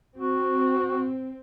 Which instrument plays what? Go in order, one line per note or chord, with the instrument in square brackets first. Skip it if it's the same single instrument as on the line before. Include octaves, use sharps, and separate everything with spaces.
[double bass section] C4 [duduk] F#4